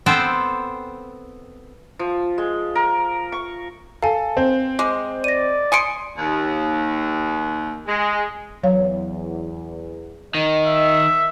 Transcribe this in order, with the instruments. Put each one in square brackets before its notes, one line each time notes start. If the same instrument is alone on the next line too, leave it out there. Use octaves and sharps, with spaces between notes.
[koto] B3 C4 A4 C5 G5
[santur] F3
G#3
A#4
C#6
[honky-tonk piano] A4 [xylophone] F5 G#5
[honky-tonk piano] C4
[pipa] G#3 [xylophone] D6
[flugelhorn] D5 [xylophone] A#6 D#7
[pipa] G#5 C6 [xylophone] D#6 C#7 D7
[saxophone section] D#2
G#3
[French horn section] E2 [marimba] F#3 C#5 F5
[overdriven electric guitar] D#3 [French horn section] D#5
[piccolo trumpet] E5